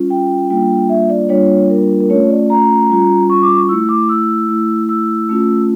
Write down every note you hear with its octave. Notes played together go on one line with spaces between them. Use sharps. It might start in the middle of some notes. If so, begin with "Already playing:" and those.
Already playing: G3 C#4 F4
G5
G3 A#3 D4 F4 G5
E5
D5
G3 A#3 D4 F4 C#5
A#4
A#4
A3 C#4 F4 C#5
D5
A#5
G3 C#4 F4
C#6
D6
C#6
A3 E4 E6
D6
E6
A3 E4
E6
A3 C#4 F4